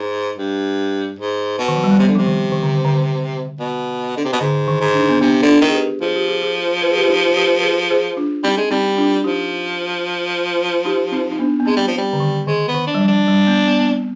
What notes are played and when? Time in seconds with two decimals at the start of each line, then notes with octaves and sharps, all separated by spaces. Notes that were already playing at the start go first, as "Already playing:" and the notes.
Already playing: G#2
0.37 G2
1.18 G#2
1.58 B2
1.68 D#3
1.76 F3
1.84 G3
1.91 G#3
1.99 C3 B3
2.08 D3
2.15 C3 F3
2.26 D#3
2.52 D#3
2.63 D3
2.85 D3
3.60 B2
4.17 D3
4.25 C3
4.32 B2
4.40 G#2 D3
4.68 D#3
4.81 G#2
4.94 D4
5.01 D#4
5.09 B3 D4
5.21 C3 B3 D4
5.42 D3
5.48 D4 F4
5.61 D#3
5.68 G#4
5.75 G4 B4
6.02 F3 G#4
6.16 G4
6.28 F4 G#4
6.42 F4 G#4
6.82 B4
6.90 G#4
6.98 G4 B4
7.06 F4
7.09 D#4 G4
7.31 C5
7.37 G4 B4
7.59 B4
7.63 G#4 C5
7.90 G#4 C5
8.17 D4 F4
8.43 G3 C4 D#4
8.57 G#3
8.70 G3 C4 D#4
8.97 D4 F4
9.24 F3 D#4 G4
10.85 D#4 G4
11.12 C4 D#4
11.32 D#4
11.39 B3 D4
11.60 B3
11.66 G#3 C4
11.76 G3
11.87 F3
11.98 G3
12.13 D3
12.20 D#3
12.47 D#3 G#3
12.68 B3
12.74 D#3
12.87 D4
12.95 G3
13.01 F3
13.08 D4
13.28 G3
13.47 B3
13.67 B3
13.80 B3
13.88 C4